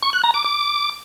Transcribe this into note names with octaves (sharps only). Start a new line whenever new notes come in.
C#6
F#6
A#5
D6
D6